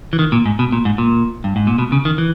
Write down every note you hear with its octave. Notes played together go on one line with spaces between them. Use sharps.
E3
D#3
A#2
G#2
B2
A#2
G#2
A#2
G2
G#2
A#2
B2
C#3
D#3
E3